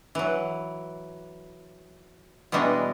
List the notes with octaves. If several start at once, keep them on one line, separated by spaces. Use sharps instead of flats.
E3 F#3
B2 E3 G3 G#3 D4